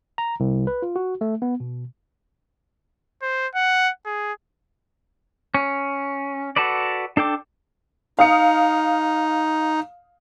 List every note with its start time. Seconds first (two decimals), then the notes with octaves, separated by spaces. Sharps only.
0.18 A#5
0.40 C2
0.67 B4
0.82 F4
0.96 F#4
1.21 A3
1.42 B3
1.60 B2
3.22 C5
3.55 F#5
4.06 G#4
5.54 C#4
6.56 F#4 A4 B4 D5
7.17 D4 A4 G5 D6
8.19 D#4 F5 D#6 C#7